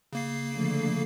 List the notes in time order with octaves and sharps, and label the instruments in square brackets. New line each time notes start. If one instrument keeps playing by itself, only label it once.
[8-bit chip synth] C#3 A#3 C7
[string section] D3 F3 A3